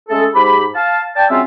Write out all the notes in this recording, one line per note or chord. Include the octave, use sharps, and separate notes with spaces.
G#3 A3 C#4 G#4 A4
G#2 G4 B5
F5 A5
D5 G5 A5
F#3 G#3 C4 C#4 F4 E5